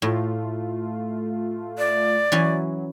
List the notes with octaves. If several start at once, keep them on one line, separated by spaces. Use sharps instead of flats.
A2 A3 F4
D5
E3 F#3 C#4 G#5